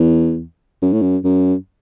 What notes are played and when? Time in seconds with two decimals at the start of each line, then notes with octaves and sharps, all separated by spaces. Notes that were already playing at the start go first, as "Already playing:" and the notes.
Already playing: E2
0.82 F#2
0.92 A2
1.02 F#2
1.24 F#2